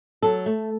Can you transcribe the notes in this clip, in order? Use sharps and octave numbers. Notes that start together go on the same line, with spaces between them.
F#3 A4
A3